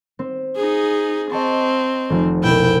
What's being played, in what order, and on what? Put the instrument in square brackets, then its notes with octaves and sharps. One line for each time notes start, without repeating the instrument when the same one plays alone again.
[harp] C4
[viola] D#4 G#4
[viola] C4 [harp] D#5 A5 C#6
[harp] F1 F3
[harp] C2 B2 [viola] E4 G5